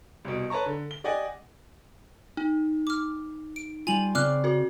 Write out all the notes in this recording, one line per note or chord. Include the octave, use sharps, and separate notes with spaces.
C2 B2
B4 C#5 A5 A#5 C#6
D3
G7
G4 D5 D#5 F#5 G#5
D#4
D6 F6
D7
G3 F4 G#5 F7 F#7
C#3 C4 D5 D6 F6 F#6
F#4 A#4